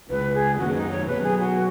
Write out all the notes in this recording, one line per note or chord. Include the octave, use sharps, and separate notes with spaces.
C#2 C#3 G#3 B4
G#4
F#2 D#3 A#3 C#4 F#4
D#4
C#5
B2 F#3 B3 B4
G#4
F#4